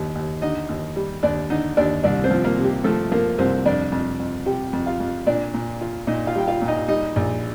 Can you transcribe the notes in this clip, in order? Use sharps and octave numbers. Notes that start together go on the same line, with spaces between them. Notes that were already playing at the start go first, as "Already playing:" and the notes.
Already playing: D#2 D4
D#2
D3 D#4 D#5
D#2
G3
D#2 D4 D5
D3 D#4 D#5
D#2 D4 D5
C2 D4 D5
C4 C5
F3
A#3 A#4
C3
G4
F3 A3 A4
F3 A#3 A#4
C2 C4 C5
F2 D4 D5
F2
F2
C3 G4 G5
F2
F4 F5
F2
A#2 D4 D5
A#2
F4
A#2 D#4 D#5
F4 F5
G3 G5
F4 F5
A#2
D#4 D#5
G3 D#4 D#5
A#1